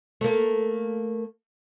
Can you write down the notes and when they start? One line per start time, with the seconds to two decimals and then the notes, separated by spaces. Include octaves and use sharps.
0.21 A3 A#3